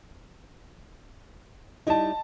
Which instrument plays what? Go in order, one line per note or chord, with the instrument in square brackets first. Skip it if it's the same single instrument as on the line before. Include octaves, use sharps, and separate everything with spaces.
[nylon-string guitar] G3 D#4 E4 [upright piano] D#5 A5